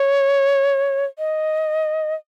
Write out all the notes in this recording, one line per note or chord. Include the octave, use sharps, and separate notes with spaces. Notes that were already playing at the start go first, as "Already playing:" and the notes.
Already playing: C#5
D#5